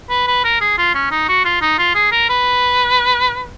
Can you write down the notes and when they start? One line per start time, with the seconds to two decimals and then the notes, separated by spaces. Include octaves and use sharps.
0.10 B4
0.27 B4
0.44 A#4
0.61 G#4
0.78 F4
0.95 C#4
1.11 D#4
1.29 F#4
1.45 F4
1.62 D#4
1.78 F4
1.95 G#4
2.12 A#4
2.29 B4